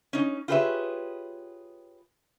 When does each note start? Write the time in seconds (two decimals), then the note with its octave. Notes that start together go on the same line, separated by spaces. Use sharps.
0.13 C#4 D#4
0.48 F4 G4 G#4 B4 C#5 E5